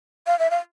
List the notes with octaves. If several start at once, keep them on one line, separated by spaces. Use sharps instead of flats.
F5
E5
F5